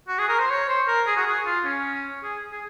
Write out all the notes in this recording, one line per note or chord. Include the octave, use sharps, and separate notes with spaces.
F#4
G#4
A#4
C5
C#5
C5
A#4
G#4
F#4
G#4
F4
C#4
G#4
G#4